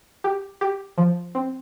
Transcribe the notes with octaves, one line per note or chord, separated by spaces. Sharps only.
G4
G4
F3
C4